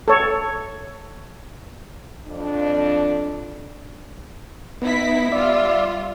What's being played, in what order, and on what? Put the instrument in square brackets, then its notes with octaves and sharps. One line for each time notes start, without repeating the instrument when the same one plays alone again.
[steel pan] A4 C#5
[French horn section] F2 D4
[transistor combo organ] B3 [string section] D#4 E4 B6
[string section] G3 F4 [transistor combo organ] D5 E5